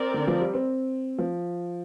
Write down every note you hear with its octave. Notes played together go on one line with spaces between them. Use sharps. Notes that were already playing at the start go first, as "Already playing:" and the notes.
Already playing: C4 A#4 D5
D3
F3
G3
C4
F3